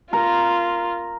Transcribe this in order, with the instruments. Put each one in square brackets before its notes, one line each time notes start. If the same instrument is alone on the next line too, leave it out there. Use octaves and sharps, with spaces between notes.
[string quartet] F4 [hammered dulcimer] A#4